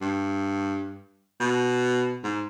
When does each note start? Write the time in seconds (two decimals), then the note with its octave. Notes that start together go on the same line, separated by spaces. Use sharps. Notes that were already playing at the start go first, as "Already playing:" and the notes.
0.01 G2
1.40 B2
2.23 G#2